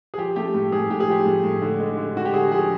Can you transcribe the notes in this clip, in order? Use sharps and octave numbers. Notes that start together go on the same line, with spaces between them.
G#4
F3 G4
A3 G4
A2
A2 G#4
A2 G4
G#4
F3 G4
A2
A2
D3
G#3
D3
D3 F#4
G4
D3 G#4
F3 G#4